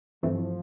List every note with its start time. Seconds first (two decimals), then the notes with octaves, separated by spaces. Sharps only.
0.23 G2 E3 F3 A3 C4